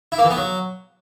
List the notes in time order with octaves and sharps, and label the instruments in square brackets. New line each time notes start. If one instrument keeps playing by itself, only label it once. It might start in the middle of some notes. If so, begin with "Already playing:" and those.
[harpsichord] E4
A#3
E3
B3
F#3